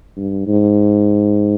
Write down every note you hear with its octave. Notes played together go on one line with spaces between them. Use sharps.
G2
G#2